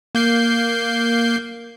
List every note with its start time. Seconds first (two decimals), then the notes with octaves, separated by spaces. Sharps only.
0.15 A#3 G6 C7